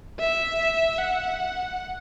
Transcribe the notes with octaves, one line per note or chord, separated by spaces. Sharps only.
E5
F#5